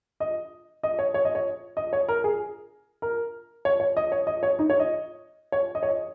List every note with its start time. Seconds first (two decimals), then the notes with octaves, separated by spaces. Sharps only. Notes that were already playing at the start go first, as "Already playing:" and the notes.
0.20 D#5
0.83 D#5
0.99 C#5
1.14 C#5
1.25 D#5
1.35 C#5
1.77 D#5
1.93 C#5
2.08 A#4
2.24 G#4
3.02 A#4
3.65 C#5
3.80 C#5
3.97 D#5
4.12 C#5
4.27 D#5
4.43 C#5
4.59 D#4
4.70 C#5
4.80 D#5
5.52 C#5
5.75 D#5
5.83 C#5
5.89 D#5